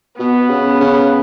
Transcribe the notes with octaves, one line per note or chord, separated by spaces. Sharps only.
B2 B3
C#3
C#3